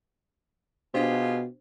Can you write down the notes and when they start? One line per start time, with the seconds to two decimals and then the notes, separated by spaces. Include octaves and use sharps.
0.94 B2 D4 F4 G4 G#4 C5